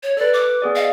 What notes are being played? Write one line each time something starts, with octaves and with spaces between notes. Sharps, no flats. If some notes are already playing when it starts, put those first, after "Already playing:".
C#5
A4 B4 D5
D6
B3 G#4 D5
D#5 F5